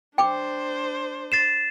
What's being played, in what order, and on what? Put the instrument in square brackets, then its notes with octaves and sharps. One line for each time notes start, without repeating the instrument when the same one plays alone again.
[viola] D4 C5 [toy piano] G5 D6
[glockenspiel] A6 C7 E7